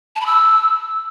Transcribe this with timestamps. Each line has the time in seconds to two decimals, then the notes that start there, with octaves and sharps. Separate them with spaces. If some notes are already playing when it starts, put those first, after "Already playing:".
0.16 A5
0.21 B5
0.26 E6